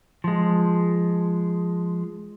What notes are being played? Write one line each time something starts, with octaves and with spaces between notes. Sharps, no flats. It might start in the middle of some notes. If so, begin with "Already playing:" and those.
F3 G#3